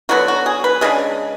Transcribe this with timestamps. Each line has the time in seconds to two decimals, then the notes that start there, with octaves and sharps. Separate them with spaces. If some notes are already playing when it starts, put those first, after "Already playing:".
0.09 D3 F#3 B3 F#4
0.28 F#4
0.46 G#4
0.64 B4
0.81 C#3 G#3 D4 G#4